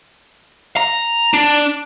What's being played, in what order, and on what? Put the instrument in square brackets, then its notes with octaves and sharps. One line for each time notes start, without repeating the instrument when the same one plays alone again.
[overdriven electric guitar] A#5
D4